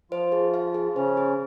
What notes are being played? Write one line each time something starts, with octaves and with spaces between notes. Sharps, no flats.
F3 F4 C5
G#4
F5
G#4
C#3 C#4 C5
G#4